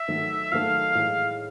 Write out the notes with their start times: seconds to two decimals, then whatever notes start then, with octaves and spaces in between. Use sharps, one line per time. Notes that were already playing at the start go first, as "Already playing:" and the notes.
Already playing: E5
0.08 G#2 D#3 F#3 A3
0.52 G#2 D#3 F#3 A3 F5
0.95 A2 E3 G#3